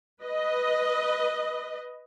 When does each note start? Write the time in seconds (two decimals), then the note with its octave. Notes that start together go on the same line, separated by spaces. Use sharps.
0.22 B4 D#5